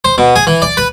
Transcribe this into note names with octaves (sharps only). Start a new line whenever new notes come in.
C5
B2
G#4
E3
D5
B4